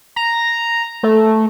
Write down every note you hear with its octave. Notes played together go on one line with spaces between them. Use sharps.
A#5
A3